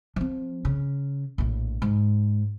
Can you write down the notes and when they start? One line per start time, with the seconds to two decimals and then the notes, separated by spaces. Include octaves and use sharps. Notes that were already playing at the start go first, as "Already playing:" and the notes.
0.16 F3 C4
0.65 C#3
1.38 A#1 A2
1.82 G#2